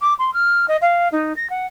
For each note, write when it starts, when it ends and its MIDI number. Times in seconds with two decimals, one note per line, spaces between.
0.01 0.14 86
0.19 0.33 84
0.33 0.65 89
0.68 0.77 75
0.81 1.08 77
1.12 1.35 63
1.36 1.49 94
1.50 1.66 78